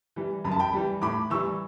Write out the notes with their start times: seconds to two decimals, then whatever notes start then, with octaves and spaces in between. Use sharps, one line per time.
0.16 E3 G3
0.44 F#2 B5
0.51 A5
0.59 G5 B5
0.73 E3 G3
1.02 A2 B5 D6
1.30 E3 G3 C#6 E6